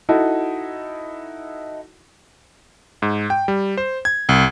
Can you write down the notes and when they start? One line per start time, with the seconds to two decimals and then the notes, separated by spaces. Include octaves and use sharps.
0.09 D#4 E4 F#4 A4
3.02 G#2
3.30 G5
3.48 G3
3.77 C5
4.05 G#6
4.29 C2